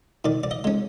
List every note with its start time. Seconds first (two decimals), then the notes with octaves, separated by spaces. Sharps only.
0.25 D#3 D5
0.44 D5
0.51 D#5
0.64 G#3 C#4